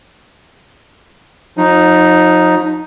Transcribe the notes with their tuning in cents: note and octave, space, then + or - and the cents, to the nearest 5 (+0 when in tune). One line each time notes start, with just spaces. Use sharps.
F3 +40 D#4 +0